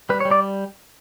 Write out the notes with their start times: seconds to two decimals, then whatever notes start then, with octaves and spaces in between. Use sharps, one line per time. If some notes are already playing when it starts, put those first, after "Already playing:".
0.09 G3 B4
0.20 C#5
0.25 G3
0.31 D5